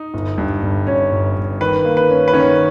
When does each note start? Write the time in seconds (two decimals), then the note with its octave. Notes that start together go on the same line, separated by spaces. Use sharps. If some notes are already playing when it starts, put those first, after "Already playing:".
Already playing: D#4
0.14 G1
0.38 G2
0.62 G1
0.86 G1 C#4 C#5
1.11 G1
1.36 G1
1.61 D#3 B4
1.85 A#3
1.97 B4
2.10 C#4
2.28 B4
2.33 D#3 C#4 C#5